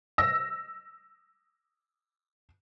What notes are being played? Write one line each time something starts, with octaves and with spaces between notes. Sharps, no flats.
E6 A#6